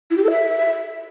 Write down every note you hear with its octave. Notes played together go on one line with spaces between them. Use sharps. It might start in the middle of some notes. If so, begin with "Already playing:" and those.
E4
G4
A4
E5